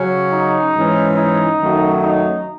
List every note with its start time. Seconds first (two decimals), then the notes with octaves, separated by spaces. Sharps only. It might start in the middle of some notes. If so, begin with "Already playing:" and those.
Already playing: C#3 F#3 C#4
0.33 D#4
0.75 G#2 E3 G#3 C#4
1.17 D#4
1.60 F#2 D#3 F#3 A3 C#4
2.02 D#4